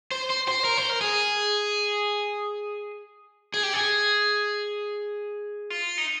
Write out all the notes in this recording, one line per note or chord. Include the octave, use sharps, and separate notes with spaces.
C5
C5
C5
A#4
C5
A#4
G#4
G#4
G4
G#4
F4
D#4